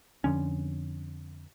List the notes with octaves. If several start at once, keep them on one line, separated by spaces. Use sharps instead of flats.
F2 D3 C#4